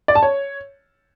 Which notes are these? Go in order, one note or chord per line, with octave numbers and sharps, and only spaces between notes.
D5
A5
C#5